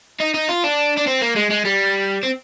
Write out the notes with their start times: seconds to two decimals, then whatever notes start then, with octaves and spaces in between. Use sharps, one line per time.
0.20 D#4
0.34 D#4
0.49 F4
0.64 D4
0.97 D4
1.07 C4
1.21 A#3
1.36 G#3
1.50 G#3
1.65 G3
2.23 C4